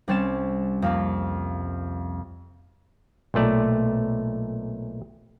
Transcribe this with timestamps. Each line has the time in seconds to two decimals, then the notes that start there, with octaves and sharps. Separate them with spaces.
0.08 C2 G3 C4 C#4 A6 E7
0.82 F2 A#3 C4
3.34 B1 A#2 A3 D5